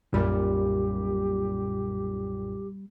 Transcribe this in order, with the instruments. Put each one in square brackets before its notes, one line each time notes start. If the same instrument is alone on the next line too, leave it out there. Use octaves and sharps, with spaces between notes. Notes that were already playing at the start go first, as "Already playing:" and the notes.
[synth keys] B1 F#2 A#2 [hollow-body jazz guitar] G3 A#3 [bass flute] G4